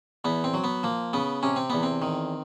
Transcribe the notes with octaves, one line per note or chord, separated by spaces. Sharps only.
E2 B3
C4
F#3
B3
F3 A#3
C#3 B3
C3 C#4
C4
E2 B3
C4
D#3